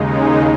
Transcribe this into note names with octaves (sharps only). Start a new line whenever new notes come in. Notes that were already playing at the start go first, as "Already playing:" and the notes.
Already playing: D#2 C#3 G#3 D#4